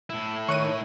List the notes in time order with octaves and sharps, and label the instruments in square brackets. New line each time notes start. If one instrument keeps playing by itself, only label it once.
[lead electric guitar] A2 E4
[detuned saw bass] D#3 [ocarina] C#5 [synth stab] C#6 F#6 D#7